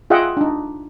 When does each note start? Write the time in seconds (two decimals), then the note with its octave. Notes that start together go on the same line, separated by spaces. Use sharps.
0.10 F4 G#4 D#5 E5 F#5 G5
0.37 D4 D#4